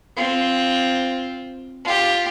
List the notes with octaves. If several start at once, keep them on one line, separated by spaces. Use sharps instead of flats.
C4 F4
F4 G4